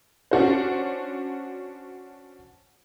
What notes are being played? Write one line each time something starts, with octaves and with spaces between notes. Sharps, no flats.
C#4 D4 F#4 C5